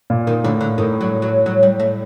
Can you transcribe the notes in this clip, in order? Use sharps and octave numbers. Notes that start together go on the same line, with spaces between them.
A#2
D#3
A2 D3
D3
A2 D#3
F#3
F#3
F#3
G3
A3